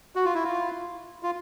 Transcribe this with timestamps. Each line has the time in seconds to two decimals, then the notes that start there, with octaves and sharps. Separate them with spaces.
0.15 F#4
0.25 F4
0.34 E4
0.44 F4
1.23 F4